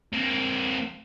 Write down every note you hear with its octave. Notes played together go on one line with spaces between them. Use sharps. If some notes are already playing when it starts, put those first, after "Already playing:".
A#3 C4